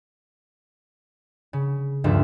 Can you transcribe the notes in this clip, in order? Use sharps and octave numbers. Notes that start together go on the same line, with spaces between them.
C#3
F1 D2 G2 F3 A3 E5